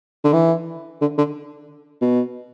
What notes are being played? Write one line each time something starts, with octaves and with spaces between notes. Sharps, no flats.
D3
E3
D3
D3
B2